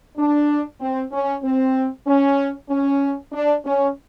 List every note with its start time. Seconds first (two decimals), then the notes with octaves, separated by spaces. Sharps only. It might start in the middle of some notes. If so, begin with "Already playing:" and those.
0.17 D4
0.80 C4
1.12 C#4
1.43 C4
2.06 C#4
2.70 C#4
3.32 D4
3.65 C#4